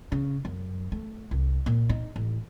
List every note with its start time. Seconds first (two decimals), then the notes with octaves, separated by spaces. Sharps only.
0.12 C#3
0.45 F#2
0.92 A3
1.31 C2
1.66 A#2
1.90 D#4
2.16 A1